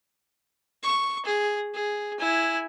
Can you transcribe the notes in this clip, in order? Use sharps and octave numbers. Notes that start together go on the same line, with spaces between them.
C#6
G#4
G#4
E4 G#5